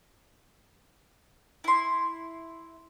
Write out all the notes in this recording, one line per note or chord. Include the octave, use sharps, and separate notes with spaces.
E4 C6